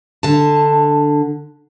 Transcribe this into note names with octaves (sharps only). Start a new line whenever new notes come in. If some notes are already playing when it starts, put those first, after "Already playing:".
D3 A5